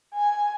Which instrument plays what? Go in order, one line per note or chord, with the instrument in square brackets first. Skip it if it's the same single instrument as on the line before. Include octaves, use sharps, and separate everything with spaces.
[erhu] G#5